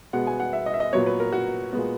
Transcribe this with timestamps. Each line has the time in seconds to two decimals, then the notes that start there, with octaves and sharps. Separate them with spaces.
0.13 B2 G#3 B3 F#5
0.27 G#5
0.40 F#5
0.53 E5
0.66 D#5
0.74 E5
0.80 D#5
0.93 A#2 F#3 B3 C#5
1.06 B4
1.20 A#4
1.32 F#4
1.73 A#2 G#3 B3